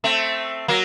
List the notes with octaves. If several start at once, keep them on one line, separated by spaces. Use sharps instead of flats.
A3 C4
F#3 A#3